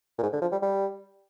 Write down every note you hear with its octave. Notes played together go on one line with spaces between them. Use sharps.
A#2
G#2
D3
F3
G3
G3